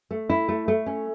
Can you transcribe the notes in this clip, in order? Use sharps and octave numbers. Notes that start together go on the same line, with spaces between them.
A3
E4
A3
A3
C#4